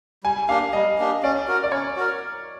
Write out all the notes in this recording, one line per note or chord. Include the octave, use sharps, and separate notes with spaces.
G3 G#5
A#3 D4 G4 F5
G3 D#5
A#3 D4 G4
C#4 D5
F#4 A#4
D5
C#4 C#5
F#4 A#4